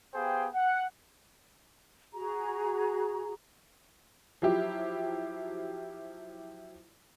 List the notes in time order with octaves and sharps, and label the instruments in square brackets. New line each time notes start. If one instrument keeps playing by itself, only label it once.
[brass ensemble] B3 G4 G#4 C5 F5 G5
F#5
[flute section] F#4 G#4 A#5
[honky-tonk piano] F3 F#3 E4 G4